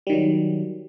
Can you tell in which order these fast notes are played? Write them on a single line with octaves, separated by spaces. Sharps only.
G3 D#3 F#3